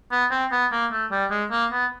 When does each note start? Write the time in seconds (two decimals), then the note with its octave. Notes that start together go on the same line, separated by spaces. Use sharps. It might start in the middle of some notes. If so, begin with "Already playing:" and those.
0.12 B3
0.31 C4
0.52 B3
0.72 A#3
0.92 A3
1.11 G3
1.31 G#3
1.51 A#3
1.72 B3